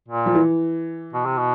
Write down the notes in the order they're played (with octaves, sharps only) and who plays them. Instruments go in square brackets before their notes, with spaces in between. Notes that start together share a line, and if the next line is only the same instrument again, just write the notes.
[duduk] A#2
[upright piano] F3
E3
[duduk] B2
C3
B2